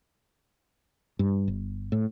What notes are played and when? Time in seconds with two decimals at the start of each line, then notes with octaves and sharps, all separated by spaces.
1.19 G2
1.48 G1
1.92 A2